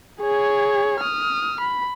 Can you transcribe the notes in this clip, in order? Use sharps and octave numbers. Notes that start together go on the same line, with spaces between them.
G#4 C#5
D#6 F6
B5